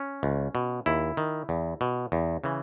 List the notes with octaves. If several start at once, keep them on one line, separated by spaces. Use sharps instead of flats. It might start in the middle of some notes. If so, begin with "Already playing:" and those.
Already playing: C#4
C#2
B2
D#2 E4
D#3
E2
B2
E2
C#3 E3